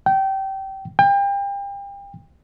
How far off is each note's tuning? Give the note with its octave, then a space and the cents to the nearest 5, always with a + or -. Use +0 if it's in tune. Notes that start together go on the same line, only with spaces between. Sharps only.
G5 -20
G5 +35